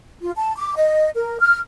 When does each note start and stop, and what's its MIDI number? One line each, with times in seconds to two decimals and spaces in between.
0.22 0.31 65
0.36 0.54 81
0.56 0.74 86
0.75 1.09 75
1.15 1.39 70
1.40 1.57 89